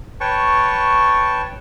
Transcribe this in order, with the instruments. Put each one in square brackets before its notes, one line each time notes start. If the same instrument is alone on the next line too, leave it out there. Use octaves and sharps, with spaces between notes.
[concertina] B4 C#5 G5 A5 C#6